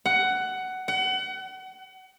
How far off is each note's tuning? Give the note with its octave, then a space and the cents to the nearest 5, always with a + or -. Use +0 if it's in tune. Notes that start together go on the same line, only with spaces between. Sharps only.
F#5 +15
F#5 +30